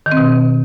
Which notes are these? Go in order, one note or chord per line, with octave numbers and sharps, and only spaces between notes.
D#3
C4
B2